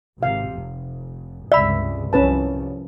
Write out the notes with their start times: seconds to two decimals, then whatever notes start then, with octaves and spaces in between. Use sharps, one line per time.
0.23 G#1 C3 F5
0.55 F1
1.52 C#2 G2 C3 D5 E5 B5
2.13 C2 C3 F3 C#4 B4 A5